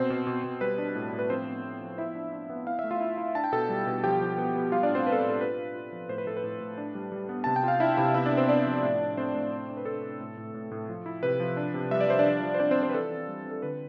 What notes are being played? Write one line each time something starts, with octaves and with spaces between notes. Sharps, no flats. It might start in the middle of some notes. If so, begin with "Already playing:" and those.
Already playing: B2 C4 C5
B2
B2
B2
G3 B4
D4
A2
A2
B4
F3 C4 C5
B3
B3
F3
B3 E4 E5
D4
D4
B3
E4 F5
E5
A3
F4 F5
E4
E4
D4 A5
G5
B2 A4 A5
G3
B2
F3 G4 G5
F3
B3
B3
G3 F4 F5
D4 D5
A2
C4 C5
B3 B4
A4
B4
A2
A4
F4 B4
F4
F4
F3
A2 C5
B4
A2 A4
B4
A2
A2
D4
G3
G3
B3
C3 A5
G5
F4 F5
D4 E4 E5
C3 E4 E5
B3 E4 E5
D4 D5
B3
C4 C5
B3 D4 D5
F3
A2
A2
A3 C4 C5
A2
D4
D4
B4
D4 A4
D4
A2
A2
A2
A2
F3
E4
C3 B4
F3
D4
C3
G3 E5
D5
G3 C5
D4 D5
F3
F3
C5
C4 D4 D5
C4 C5
F4
C4 C5
B4
E3 A4
C4
G3
C4
A4
D3 B4